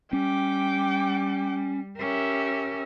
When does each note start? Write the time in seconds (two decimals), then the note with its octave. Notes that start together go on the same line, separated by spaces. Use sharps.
0.13 G3 C#4 G5 D6
1.98 C#4 G4 A#4 E5